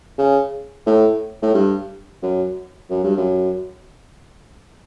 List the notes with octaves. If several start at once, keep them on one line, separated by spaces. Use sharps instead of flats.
C#3
A2
A2
G2
F#2
F#2
G2
F#2